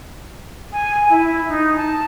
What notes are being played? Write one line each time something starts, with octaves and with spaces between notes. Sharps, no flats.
G#5
E4
D#4
A5